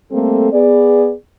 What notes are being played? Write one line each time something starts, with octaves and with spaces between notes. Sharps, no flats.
G3 A3 A#3 C4 A4
B3 G#4 D5